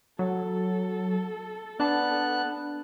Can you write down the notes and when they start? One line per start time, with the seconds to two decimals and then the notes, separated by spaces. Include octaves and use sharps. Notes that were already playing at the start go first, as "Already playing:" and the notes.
0.19 F#3 A4
1.80 B3 D4 A5 F#6